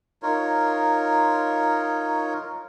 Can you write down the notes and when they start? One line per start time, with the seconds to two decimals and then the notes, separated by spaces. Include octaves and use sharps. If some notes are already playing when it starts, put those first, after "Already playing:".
0.22 D#4 F4 A#4 C#5